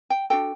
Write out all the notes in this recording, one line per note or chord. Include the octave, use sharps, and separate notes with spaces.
G5
D4 F#4 A4 G5